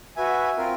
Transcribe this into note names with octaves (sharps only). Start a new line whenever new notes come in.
F#4 B4 E5 G#5
C4 F4 A#4